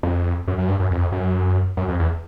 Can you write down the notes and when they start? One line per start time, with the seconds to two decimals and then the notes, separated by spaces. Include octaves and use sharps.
0.03 F2
0.48 F#2
0.58 F#2
0.68 G2
0.80 F#2
0.91 F2
1.12 F#2
1.77 F#2
1.89 F2
1.99 E2